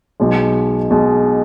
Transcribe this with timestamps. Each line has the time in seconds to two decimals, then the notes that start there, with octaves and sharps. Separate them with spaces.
0.20 B1 B2 G#3
0.90 B1 B2 G#3